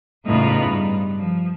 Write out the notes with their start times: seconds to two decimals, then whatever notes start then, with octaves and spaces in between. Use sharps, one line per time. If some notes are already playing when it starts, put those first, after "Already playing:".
0.25 E2 A2 C#3 D#4 F4 B4
0.63 G2
1.19 F3